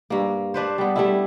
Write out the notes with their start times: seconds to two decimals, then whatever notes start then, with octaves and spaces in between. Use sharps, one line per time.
0.10 G2 A#3
0.54 D4 B4 C5
0.78 G3 B3
0.96 G3 A3 E4